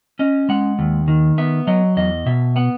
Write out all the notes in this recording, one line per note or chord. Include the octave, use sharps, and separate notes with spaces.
C#4 D#5
G#3 F#5
D#2
D#3
B3 E5
F#3 D#5
E2 D#5
B2 E5
B3 F#5